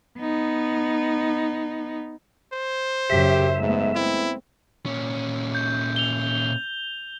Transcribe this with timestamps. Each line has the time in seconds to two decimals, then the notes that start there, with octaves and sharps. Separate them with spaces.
0.19 B3 D#4
2.53 C5
3.10 F#2 C#3 G4 E5
3.58 G#2 G#3 A3 B3
3.95 C4 E4
4.86 A#2 C#4
5.55 G6
5.96 F7 G7